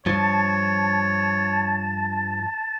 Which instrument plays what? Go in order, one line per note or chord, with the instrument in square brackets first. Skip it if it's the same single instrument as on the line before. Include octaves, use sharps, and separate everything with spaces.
[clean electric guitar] G2 F3 [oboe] C#5 [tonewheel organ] A5